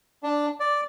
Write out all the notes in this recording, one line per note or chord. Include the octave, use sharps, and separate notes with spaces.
D4
D5